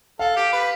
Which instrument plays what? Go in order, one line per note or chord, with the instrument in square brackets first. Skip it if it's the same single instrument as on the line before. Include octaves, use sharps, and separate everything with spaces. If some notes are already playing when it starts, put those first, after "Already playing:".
[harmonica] A4 [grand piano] F5
[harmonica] G4
B4